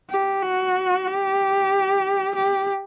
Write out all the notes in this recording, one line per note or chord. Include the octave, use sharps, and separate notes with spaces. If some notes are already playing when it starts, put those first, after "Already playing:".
G4
F#4
G4
G4